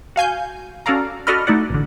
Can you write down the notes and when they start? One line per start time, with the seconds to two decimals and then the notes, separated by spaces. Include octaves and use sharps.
0.16 F#4 F5 G#5 G6
0.86 C#4 F#4 A4 D5 F5 A#5
1.27 F#4 A4 D5 D#5 B5 F6
1.47 A3 D#4 E4 D5 F#5
1.70 A1 D3